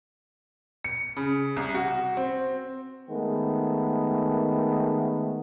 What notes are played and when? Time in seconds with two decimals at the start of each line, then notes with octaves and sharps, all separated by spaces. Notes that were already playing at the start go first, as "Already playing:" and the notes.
0.84 C#7
1.17 C#3
1.56 C2
1.75 F#4
2.17 C4
3.09 D#3 G#3 A3 B3